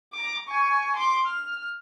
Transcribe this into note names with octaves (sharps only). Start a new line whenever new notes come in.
A#5 D6
G#5 C#6
C6 D6
F6